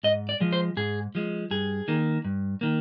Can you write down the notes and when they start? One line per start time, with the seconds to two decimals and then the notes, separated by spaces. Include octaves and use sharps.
0.03 G#2 D#5
0.29 D5
0.40 F3 G#3
0.53 C5
0.77 G#2 G#4
1.15 F3 G#3
1.51 G2 G#4
1.88 D#3 A#3
2.25 G2
2.61 D#3 A#3